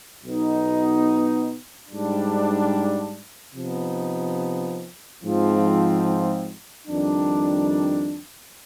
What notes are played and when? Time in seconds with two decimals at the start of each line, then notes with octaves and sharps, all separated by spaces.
0.24 B1 B2 B3 D#4
1.90 G#2 G3 D4
3.55 C3 F3 B3 D#4
5.21 G#2 F3 C4
6.87 F2 D#3 G3 D4